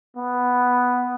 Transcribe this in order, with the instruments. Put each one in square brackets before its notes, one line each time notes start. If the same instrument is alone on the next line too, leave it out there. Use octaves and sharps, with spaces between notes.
[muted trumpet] B3